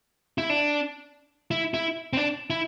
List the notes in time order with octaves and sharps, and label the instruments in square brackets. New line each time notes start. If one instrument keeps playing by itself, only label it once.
[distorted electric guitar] E4
D4
E4
E4
C4
D4
E4